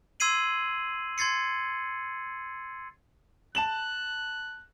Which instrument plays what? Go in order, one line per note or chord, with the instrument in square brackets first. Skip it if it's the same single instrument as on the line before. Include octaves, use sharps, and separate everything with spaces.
[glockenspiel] C6 E6 G#6 C7 D#7 F#7
C6 G#6 A6 C7 C#7
[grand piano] A5 E7 F#7 [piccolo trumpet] F#6